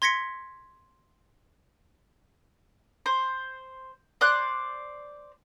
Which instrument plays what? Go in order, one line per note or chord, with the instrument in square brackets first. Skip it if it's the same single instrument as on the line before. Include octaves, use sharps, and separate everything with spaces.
[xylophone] C6 G#6 A#6 B6 C#7
[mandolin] C5
C5 D5 F#6